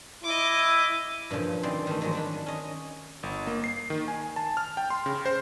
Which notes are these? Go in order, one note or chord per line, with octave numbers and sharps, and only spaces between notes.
E4 D#5 D6
G2 A#2 C#3 F3
D#3 E3 C4 D#4 D5 C6
D#3 G3 A3
G#2 D#3 F3 F#3 G#3
D#3 D4 B5
C#4 D#5
G1
A#3
C7
D#3
G#5
A5
F6
G5
C6
C#3
C5